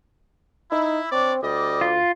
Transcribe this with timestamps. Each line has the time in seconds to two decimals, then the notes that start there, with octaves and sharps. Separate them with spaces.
0.72 D#4 E4
1.12 C4 D4 C#5 D5
1.42 D2 G3 D5 D#5
1.81 F4